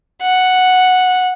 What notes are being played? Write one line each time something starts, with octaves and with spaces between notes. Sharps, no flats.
F#5